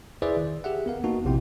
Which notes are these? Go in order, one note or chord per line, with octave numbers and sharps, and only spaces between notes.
E4 G#4 B4 C5 D5 E5
D#3
G4 G#4 E5 F#5
B3 A#4 F5
A#3 B3 D#4 F#4 A5
A#1 C3 E4 G5